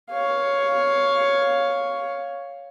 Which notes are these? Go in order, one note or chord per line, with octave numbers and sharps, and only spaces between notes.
C#5 F5